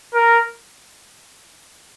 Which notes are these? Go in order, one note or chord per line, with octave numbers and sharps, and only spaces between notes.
A#4